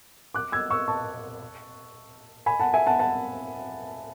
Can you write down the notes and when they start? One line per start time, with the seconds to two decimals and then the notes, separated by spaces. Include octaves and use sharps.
0.34 D6 F#6
0.52 E6 G#6
0.71 C#6 E6
0.88 A5 C#6
2.46 G#5 B5
2.60 F#5 A5
2.74 E5 G#5
2.86 F#5 A5
2.99 F#5 A5